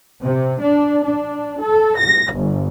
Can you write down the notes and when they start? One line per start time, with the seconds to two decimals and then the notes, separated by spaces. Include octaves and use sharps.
0.23 C3
0.61 D4
1.05 D4
1.61 A4
1.98 A#6
2.33 G1